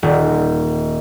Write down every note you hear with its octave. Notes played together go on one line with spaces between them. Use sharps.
D#1